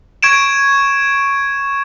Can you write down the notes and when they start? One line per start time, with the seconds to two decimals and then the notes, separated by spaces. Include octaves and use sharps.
0.23 C#6 G#6 D7 E7